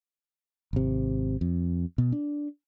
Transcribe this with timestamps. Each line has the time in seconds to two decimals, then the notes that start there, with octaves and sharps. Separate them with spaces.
0.73 G#1 C3
1.41 F2
1.98 B2
2.12 D4